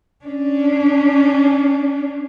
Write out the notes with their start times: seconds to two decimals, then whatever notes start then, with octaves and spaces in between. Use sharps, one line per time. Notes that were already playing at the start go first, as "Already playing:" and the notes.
0.24 C#4 D4